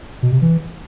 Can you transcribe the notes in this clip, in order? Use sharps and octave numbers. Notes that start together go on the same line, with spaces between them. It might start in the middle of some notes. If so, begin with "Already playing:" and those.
B2
C3
E3